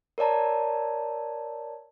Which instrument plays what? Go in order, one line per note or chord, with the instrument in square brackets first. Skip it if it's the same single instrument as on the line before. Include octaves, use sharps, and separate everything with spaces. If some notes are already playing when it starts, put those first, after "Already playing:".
[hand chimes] A#4 C#5 D5 A5 A#5